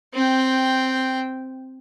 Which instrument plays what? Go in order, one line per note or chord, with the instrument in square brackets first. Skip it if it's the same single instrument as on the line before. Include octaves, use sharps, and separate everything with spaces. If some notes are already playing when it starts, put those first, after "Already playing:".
[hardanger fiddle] C4 G5